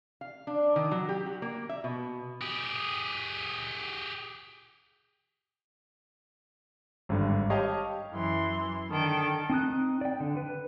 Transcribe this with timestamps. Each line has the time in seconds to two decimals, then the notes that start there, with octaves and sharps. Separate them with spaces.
0.21 F5
0.47 D4
0.76 D#3
0.91 F#3
1.09 G4
1.26 F#4
1.42 A#3
1.69 E5
1.84 B2
2.41 G4 G#4
7.09 G#1 G2 D3
7.50 G4 C#5 D#5 F5 A5
8.11 F#2 E3 C6
8.89 D3 D#3 A4 G5
9.50 C4 D#4 D#6 F#6
10.01 D5 G5
10.20 D3
10.37 B4